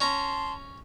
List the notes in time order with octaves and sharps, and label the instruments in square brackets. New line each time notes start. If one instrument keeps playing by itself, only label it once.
[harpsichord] C#4 A#5 [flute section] A5 C6